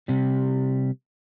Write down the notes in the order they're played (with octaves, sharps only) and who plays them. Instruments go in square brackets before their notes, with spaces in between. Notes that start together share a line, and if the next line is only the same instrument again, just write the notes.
[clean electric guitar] C3 G3